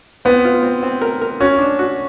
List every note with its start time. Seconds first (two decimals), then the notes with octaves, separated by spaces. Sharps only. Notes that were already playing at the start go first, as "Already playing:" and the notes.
0.25 B3 C4
0.45 F4
0.63 C4
0.83 C4
1.02 A#4
1.22 A#4
1.40 C#4 F#4
1.59 D4
1.79 F#4